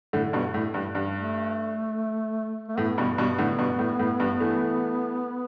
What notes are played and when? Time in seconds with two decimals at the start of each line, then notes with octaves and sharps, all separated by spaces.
0.13 A2 D3
0.33 G2 B2
0.54 A2
0.74 G2
0.95 G2
1.16 A3
2.68 A3
2.77 A2 B3
2.98 G2 B2
3.18 G2 B2
3.38 A2 D3
3.59 G2 B2
3.79 A2
3.99 A2
4.20 G2
4.40 E3 A3